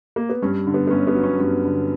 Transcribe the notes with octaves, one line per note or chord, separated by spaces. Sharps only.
A#3
B3
G2 C#4
D3
B3
B3
G1 C#4
B3
F#3
C#4
G2 C#4
D3